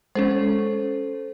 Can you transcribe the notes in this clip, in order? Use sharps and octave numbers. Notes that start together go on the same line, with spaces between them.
G#3 C#4 A4 C5